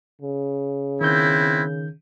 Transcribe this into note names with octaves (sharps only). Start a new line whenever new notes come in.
C#3
D#3 B3 C4 E4 G6